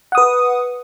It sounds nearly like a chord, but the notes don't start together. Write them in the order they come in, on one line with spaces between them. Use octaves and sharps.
F#5 D#6 B4